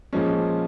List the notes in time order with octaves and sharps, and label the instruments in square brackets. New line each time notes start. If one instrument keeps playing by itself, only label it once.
[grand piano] A#2 F3 G#3 C#4